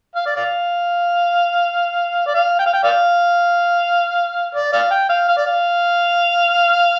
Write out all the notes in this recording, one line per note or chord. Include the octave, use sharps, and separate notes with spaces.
F5
D5
D5 F5
D5
F5
G5
F5
G5
D5 F5
D5
D5 F5
G5
F5
F5
D5
F5